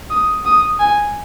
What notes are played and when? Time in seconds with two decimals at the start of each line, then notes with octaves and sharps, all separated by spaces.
0.11 D#6
0.46 D#6
0.80 G#5